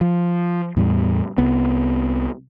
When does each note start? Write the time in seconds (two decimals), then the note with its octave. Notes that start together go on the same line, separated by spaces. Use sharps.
0.01 F3
0.77 E2 A2 G3
1.38 C2 B3